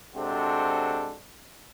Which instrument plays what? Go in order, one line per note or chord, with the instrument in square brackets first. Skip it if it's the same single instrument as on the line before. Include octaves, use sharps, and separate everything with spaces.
[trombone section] C3 G#3 D4 F#4 A4 C5